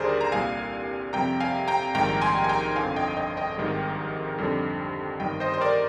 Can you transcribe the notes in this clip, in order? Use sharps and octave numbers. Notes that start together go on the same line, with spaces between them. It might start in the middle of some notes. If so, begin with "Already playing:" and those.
Already playing: D#2 D3 G3 G#4 A#4 C5 D5
A#5
C2 A#2 G3 F5 G#5
F2 C3 G3 G5 A#5
F5 G#5
G5 A#5
A#1 G#2 D#3 G3 G5 A#5
G#5 C6
G#5
G5 A#5
G1 F2 D3 F3 F5 G#5
D#5 G5
D#5 G5
D#5 G5
G#1 G#2 D#3 G3
F2 D3 G3
G1 G2 D#3 G3 D#5 G5
C5 D#5
C5
A#4 D5